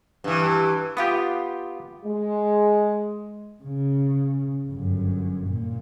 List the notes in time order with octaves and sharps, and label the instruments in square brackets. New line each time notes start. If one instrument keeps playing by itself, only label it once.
[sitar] G2 E3
[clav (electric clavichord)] B3 G4 [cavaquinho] F4 D#6
[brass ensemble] G#3
[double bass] C#3
G1 F#2
A#2